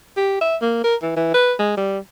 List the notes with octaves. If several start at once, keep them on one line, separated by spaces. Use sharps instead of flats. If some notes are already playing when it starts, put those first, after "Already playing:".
G4
E5
A#3
A#4
E3
E3
B4
G#3
G3